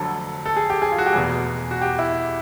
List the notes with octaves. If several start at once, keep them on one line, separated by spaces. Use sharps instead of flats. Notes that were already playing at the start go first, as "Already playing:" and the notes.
Already playing: F1 F2 D3 F#3 A4
A4
G#4
G4
G#4
F4
F#4
G4
F1 E2 B2 G#4
F#4
G4
E4